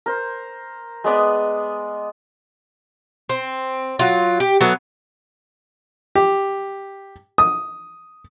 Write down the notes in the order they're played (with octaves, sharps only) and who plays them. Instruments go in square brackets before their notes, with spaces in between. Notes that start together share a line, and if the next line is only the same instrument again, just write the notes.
[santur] A#4 C5
G#3 B3 D5 D#6
[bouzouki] C4
F#3 F4
G4
F#3 A3 B3
[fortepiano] G4
D#6